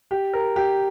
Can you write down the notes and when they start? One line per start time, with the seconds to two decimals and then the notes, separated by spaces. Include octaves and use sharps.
0.11 G4
0.33 A#4
0.56 G4